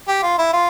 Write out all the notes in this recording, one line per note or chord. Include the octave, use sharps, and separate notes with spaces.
G4
F4
E4
F4